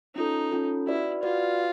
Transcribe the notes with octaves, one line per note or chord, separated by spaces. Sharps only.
C#4 D#4 F4 A4
C#4 F4 A4
E4 F#4 B4 D5
F4 F#4 B4 D5